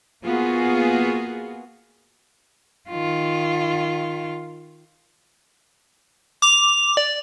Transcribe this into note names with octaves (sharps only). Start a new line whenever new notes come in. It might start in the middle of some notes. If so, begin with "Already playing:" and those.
A#3 B3 F4 F#4 G#4
D#3 F4
D6 F7
D5